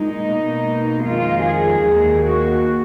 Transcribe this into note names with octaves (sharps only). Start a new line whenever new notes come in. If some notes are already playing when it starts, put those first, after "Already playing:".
Already playing: A#2 G#3 D#4
B2 A#3
F2 D#3 G#3 F4
G#4
D#2 D#3 A#3
F#4